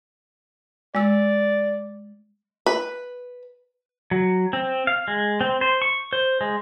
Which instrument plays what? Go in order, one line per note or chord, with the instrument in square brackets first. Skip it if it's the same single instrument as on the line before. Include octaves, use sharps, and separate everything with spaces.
[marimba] G#3 E6 [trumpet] D5
[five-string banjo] B4
[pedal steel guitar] F#3
C4
F5
G#3
C4
C5
C#6
C5
G#3